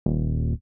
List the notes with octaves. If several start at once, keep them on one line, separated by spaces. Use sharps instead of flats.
D#1